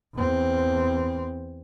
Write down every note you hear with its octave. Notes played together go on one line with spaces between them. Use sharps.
E2 C4